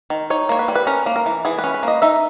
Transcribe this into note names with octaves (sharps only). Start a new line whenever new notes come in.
D#3
D#4 C#5
A#3 C#5
B4
G3
B4
C#4 A#4
A#3
A#4
E3
E3 G#4
B4
C#4
B4
A#3 D#5
D#4 E5